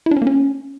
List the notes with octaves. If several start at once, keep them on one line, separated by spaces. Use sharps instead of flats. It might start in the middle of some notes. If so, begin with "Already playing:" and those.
E4
D4
C#4
A#3
C#4